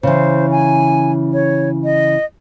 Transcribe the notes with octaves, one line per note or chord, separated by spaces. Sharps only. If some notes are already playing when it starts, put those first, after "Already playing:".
C#3 E3 C5
G#5
C#5
D#5